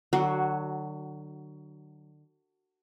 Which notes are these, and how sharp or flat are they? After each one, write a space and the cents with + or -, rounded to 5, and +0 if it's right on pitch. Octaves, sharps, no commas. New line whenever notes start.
D3 +35 F#3 +15 F#4 +0